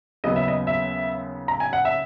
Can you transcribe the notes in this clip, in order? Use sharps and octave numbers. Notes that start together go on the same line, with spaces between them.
D#2 C#3 F#3 B3 D#5
E5
D#5
E5
A#5
G#5
F#5
E5